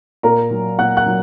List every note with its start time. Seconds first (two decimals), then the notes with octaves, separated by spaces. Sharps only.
0.23 A#2 A#4 A#5
0.51 F#3
0.79 A#2 F#5 F#6
0.97 F#5 F#6
1.06 F#3